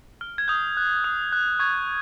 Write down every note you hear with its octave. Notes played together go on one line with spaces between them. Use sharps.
F6
G#6
D#6 G6
F#6
D#6
F#6
C#6 G#6